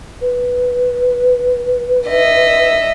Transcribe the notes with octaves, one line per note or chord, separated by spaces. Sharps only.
B4
D#5 E5